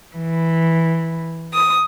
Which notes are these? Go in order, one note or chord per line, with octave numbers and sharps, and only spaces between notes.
E3
D#6